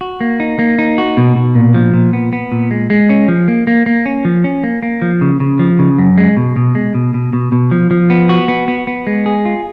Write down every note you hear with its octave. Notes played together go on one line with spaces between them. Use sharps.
F#4
A#3
D#4
A#3
D#4
F#4
B2
B2
A#2
F3
A#2
B3
B3
A#2
G#3
G#3
C#4
F3
A#3
A#3
A#3
C#4
F3
C#4
A#3
A#3
F3
C#3
C#3
F3
C#3
F#2
G#3
B2
B2
G#3
B2
B2
B2
B2
F3
F3
B3
F#4
B3
B3
B3
G#3
G#4
F4